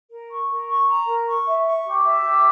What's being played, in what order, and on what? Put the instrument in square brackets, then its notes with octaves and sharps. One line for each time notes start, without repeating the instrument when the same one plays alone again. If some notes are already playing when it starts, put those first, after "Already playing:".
[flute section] A#4
C#6
A#4
C#6
A#5
A#4
C#6
E5
C#6
G4
E5
G4